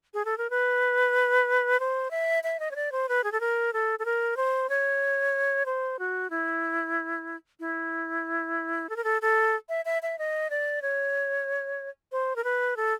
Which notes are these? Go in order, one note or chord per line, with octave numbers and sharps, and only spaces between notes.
G#4
A4
A#4
B4
C5
E5
E5
D#5
C#5
D5
C5
B4
G#4
A4
A#4
A4
A4
A#4
C5
C#5
C5
F#4
E4
E4
A4
A#4
A4
A4
E5
E5
E5
D#5
D5
C#5
C5
A#4
B4
A4